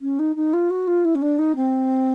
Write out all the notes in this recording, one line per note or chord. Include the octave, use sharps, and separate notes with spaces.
C#4
D#4
D#4
F4
F#4
F4
E4
C#4
D4
D#4
C4